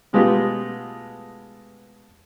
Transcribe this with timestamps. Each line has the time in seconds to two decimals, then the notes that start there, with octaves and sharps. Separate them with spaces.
0.13 B2 G#3 A3 B3 F4 G4